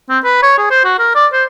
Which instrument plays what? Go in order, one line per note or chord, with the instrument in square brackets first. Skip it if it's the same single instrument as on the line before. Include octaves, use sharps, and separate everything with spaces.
[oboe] C4
B4
C#5
G#4
C5
F#4
A#4
D5
C5